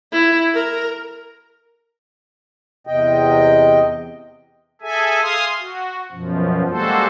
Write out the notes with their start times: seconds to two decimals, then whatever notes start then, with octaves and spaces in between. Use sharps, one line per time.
0.12 E4
0.54 A#4
2.87 E2 C3 D#5 G5
4.81 G#4 A4 E5 G#5
5.22 F5 G#5 C6 D#6
5.60 F#4
6.11 F#2 B2 F3
6.68 G3 G#3 A#3 F#4 A4 C5